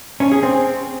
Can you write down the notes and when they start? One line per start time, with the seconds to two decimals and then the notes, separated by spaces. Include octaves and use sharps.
0.20 C#4
0.32 G#4
0.43 C4